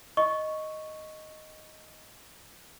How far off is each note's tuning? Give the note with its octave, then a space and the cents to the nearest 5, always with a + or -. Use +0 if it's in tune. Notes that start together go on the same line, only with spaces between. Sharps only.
D#5 +0 C#6 +0